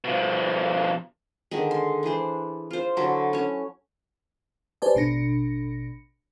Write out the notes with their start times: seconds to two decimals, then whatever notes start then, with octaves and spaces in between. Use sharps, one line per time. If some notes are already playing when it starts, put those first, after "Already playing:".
0.04 B2 F3
1.51 D3 D#3 G#3
1.71 C6
2.03 E3 D4 G#4 C5
2.71 F4 C5
2.97 D3 F#3 E4 A4
3.33 C#4 C#5
4.82 G4 B4 C5 D5 G#5 A5
4.95 A1 B2 D4 A#6 C#7